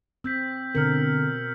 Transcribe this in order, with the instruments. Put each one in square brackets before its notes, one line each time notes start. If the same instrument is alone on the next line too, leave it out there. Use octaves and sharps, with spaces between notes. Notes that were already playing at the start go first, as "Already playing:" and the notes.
[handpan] C4 [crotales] E6 G6 B6
[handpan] B2 A#4 [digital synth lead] D3 [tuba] C4 [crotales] F6 C#7 F#7